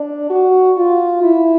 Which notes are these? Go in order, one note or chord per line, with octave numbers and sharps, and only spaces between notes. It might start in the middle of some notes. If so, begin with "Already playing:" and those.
Already playing: D4
F#4
F4
E4